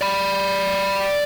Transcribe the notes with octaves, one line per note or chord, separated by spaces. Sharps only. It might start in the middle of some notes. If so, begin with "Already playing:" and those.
D5 B5